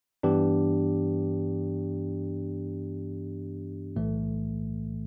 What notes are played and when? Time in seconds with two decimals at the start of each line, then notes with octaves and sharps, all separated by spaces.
0.23 G2 E3 B3 D4 G4
3.96 B1 A2 E3 A3